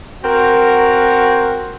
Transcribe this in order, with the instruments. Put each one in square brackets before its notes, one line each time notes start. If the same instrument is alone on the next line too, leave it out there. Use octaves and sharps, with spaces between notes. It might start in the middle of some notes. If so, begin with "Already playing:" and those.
[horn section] C4 F#4 A#4